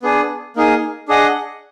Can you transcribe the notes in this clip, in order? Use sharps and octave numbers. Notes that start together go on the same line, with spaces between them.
B3 D4 G#4
A#3 D#4 G#4
D4 G#4 D#5 F#5